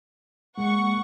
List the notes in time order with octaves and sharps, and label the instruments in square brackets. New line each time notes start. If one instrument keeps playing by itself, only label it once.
[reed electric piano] G#3 A#3 [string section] F#5 C#6